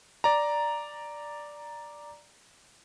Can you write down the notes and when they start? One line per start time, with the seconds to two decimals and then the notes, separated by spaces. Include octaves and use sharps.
0.24 D5 A#5